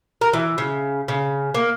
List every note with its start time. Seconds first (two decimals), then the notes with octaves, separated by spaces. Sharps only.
0.21 A#4
0.33 E3
0.58 C#3
1.08 C#3
1.55 A#3